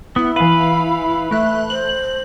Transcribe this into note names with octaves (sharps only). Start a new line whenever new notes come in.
B3 E4
E3 B4 F5
A3 E5 F#6
C5 F#7